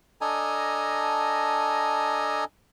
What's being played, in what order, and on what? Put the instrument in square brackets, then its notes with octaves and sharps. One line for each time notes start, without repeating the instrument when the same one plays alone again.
[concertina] D4 A4 D#5 G#5 A#5